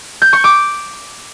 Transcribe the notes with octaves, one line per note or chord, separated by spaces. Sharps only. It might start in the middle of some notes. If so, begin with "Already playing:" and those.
G6
C#6
D6